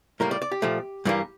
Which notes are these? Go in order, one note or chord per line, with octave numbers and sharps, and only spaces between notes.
A2 G3 A#3 A#4
D5
D5
G4
A#2 F3 A3
G2 E3 G3 A#3